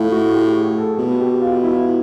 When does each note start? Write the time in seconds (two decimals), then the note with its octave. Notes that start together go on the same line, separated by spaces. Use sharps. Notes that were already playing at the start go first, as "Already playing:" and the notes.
Already playing: A2 F4
0.12 F#4
0.33 G4
0.56 G#4
0.77 A4
0.99 B2 G#4
1.20 G4
1.42 F4
1.64 E4
1.80 F4